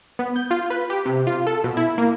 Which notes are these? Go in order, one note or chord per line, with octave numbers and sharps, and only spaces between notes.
B3
G6
F4
B4
G4
C3
F4
A4
B2
E4
A#3